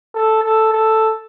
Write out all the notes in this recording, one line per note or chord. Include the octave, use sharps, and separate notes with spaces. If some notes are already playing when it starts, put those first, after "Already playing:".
A4
A4
A4